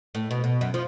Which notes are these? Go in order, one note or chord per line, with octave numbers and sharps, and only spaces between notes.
A2
B2
B2
F#2
F3